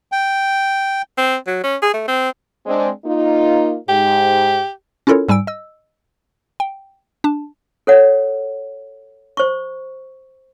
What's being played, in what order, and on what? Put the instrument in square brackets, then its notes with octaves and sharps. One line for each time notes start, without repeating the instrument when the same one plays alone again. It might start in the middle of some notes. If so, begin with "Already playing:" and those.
[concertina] G5
[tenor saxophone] C4
F#3
C#4
G#4
A3
C4
[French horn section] G#3 C4 D4
A#3 D#4 F4
[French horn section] G#2 [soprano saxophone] G4
[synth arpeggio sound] C#4 E4 F4 A4 A#4 C#5
G#2 G3 G#5 E6 D7
D#5 E6
G5
D4 A5
[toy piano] A4 C#5 F#5
C5 C#6